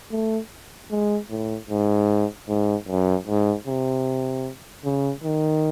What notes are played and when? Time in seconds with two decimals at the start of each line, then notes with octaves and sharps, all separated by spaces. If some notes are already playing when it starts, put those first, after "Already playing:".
0.11 A3
0.91 G#3
1.30 A2
1.70 G#2
2.49 G#2
2.88 F#2
3.28 G#2
3.67 C3
4.85 C#3
5.24 D#3